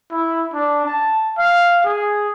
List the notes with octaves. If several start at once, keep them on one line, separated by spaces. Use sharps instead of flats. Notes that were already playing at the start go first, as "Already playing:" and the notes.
E4
D4
A5
F5
G#4